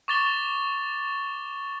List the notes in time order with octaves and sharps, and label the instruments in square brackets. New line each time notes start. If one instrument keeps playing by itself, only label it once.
[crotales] C#6 D6 A6 E7 G7